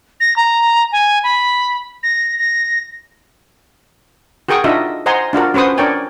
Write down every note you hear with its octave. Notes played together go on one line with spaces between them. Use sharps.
A#6
A#5
G#5
B5
A#6
A#6
F#4 G#4 A#4 G5 C#6 D#6
D4 D#4 F4 F#4 D#5 E5
C5 D#5 F#5 G#5 A#5 C6
D4 F4 F#4 A#4
C#4 F#4 B4 C5 D#6
D4 A#4 C#5 D5 G5 G#5